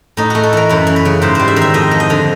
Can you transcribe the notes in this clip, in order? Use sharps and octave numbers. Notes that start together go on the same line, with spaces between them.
A2 D#4
A3 F#4
A4
E3 A#4
F#2 B4
E3
B4
C#3
G#2 C5
G3 C5
E5
D#3
E5
F2 D#5
F3
D#5
D3